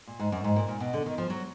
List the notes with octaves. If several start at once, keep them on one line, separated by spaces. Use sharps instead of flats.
A#2
G#2
F#2
G#2
A#2
A#2
B2
D3
D#3
F3
F#3